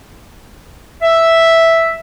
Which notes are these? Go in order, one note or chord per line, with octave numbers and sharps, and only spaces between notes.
E5